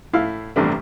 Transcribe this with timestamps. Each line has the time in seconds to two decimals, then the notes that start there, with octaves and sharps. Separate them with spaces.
0.13 A2 E4 F5
0.56 A1 E2 G2 C3 A3 D4